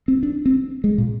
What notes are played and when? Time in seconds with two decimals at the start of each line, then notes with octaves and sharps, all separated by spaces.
0.08 C4
0.23 D4
0.46 C4
0.84 G#3
0.98 A#2